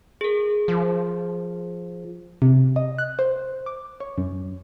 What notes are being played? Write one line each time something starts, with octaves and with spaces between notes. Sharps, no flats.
G#4 A#4
F3
C3
D#5
F#6
C5
D6
C#5
F#2